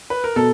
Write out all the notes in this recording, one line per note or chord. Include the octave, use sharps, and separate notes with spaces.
B4
A#4
B2 A4